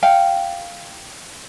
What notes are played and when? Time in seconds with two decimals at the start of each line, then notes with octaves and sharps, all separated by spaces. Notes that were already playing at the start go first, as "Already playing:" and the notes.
0.03 F5 G5